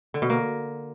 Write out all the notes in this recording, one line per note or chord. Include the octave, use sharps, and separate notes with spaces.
D3
B2
A#3